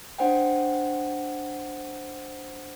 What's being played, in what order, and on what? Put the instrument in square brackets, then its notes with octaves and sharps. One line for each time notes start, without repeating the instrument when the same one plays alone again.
[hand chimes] D4 C5 F#5 G5